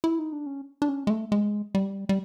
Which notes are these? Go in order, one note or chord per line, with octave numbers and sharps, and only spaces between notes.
E4
D#4
D4
C#4
D4
C#4
G#3
A3
G#3
G3
G3